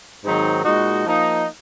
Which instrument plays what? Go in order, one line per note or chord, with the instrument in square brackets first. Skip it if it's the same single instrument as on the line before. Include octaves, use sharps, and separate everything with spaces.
[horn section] G#2 D#3 F#3 C4 D#4
A#2 G#3 D#4 F#4
F3 A#3 D#4